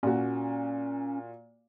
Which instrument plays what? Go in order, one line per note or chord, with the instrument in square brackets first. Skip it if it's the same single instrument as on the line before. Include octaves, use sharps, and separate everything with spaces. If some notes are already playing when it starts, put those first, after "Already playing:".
[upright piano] A#2 F#4 [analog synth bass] C#4